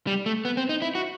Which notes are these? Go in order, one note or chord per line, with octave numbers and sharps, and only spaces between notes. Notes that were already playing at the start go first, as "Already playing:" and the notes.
G3
A3
B3
C4
D#4
E4
F#4